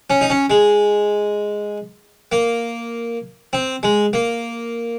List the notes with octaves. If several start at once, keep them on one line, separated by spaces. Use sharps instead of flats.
C#4
D#4
C#4
G#3
A#3
C4
G#3
A#3